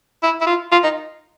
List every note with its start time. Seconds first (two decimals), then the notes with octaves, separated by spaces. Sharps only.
0.23 E4
0.41 E4
0.47 F4
0.72 F4
0.83 D#4